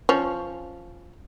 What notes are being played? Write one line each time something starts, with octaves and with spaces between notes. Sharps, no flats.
F3 C#4